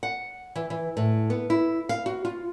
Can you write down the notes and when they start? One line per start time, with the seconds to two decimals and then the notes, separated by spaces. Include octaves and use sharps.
0.03 F#5
0.55 E3
0.70 E3
0.97 A2
1.30 B3
1.50 E4
1.89 F5
2.06 F#4
2.25 F4